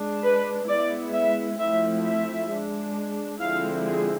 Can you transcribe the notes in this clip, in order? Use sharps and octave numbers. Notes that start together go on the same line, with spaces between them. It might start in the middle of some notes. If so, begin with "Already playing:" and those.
Already playing: G#3 D4
B4
G#3 B3 E4 D5
E5
F3 A3 C4 E4 E5
E5
G#3 D4
D3 F3 G#3 C4 E4 F5
G#4